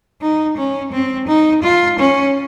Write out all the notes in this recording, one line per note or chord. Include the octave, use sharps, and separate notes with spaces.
D#4
C#4
C4
D#4
F4
C#4